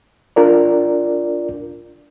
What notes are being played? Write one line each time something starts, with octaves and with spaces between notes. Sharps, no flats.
D4 F4 A#4 D5